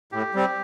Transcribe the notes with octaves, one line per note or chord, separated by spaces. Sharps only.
A2 G4
G3 C4